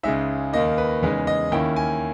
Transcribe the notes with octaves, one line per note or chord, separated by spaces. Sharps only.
C#2 C#3 G#3 D#4 E5
D#2 D#3 A#3 D#4 D#5
B4
E2 C#3 G#3 D#4 B4
D#5
D#2 D#3 A#3 C#4 E4 G5
G#5